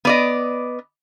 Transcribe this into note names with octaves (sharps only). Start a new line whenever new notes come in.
B3 D5 D#5